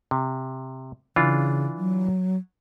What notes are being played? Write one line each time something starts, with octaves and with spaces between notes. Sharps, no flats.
C3
C#3 E3 D4 F4
F#3